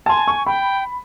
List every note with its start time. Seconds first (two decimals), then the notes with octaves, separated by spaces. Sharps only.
0.06 G#5 A5 C6
0.27 C#6
0.46 G5 B5